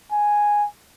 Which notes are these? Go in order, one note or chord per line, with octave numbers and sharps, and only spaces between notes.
G#5